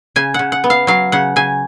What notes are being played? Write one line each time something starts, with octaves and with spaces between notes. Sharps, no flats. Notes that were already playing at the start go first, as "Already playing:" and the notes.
C#3 G#5
C#3 F#5
F#5
B3
F5
F#3 F5
C#3 F#5
C#3 G#5